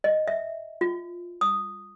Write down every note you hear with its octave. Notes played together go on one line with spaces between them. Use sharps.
D#5
E5
F4
D#6